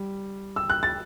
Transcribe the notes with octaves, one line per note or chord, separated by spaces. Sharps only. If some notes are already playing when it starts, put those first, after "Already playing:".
Already playing: G3
E6
F#6
A6